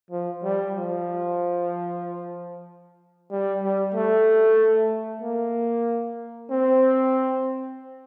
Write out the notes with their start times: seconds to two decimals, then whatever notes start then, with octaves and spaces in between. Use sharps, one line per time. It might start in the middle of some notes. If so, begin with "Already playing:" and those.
0.11 F3
0.43 G3
0.75 F3
3.31 G3
3.63 G3
3.94 A3
5.22 A#3
6.51 C4